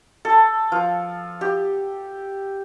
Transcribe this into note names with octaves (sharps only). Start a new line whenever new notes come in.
A4
F3
G4